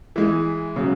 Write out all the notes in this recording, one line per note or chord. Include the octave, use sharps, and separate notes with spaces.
E3 G#3 E4
C#3 F#3